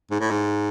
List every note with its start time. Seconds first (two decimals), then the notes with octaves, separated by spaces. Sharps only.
0.11 G#2
0.20 A2
0.31 G#2